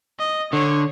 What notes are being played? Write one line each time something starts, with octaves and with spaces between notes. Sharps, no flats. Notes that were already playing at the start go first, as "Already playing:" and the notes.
D#5
D3 C#5